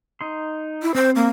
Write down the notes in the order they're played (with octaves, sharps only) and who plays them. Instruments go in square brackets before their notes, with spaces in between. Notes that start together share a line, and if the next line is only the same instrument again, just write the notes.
[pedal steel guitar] D#4 C6
[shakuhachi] E4
[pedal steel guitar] C4 [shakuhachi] C5
[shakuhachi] A#3